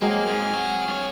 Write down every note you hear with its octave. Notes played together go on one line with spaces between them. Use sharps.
F#3 G#3 A#3 C4 G#4 F6
G#2 G5
F#3 F#4
G2 C#5